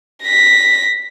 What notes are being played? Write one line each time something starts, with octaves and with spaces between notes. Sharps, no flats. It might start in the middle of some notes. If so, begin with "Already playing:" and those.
A#6 B6